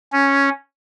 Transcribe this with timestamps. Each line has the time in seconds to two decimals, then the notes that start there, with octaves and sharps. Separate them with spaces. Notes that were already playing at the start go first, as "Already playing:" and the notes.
0.12 C#4